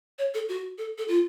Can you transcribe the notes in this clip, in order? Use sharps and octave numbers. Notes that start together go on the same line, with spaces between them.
C#5
A4
F#4
A4
A4
F4